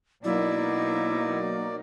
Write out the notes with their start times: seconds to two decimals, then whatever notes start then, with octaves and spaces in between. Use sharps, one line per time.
0.24 B2 F#3 A#3 D#4 E4 D5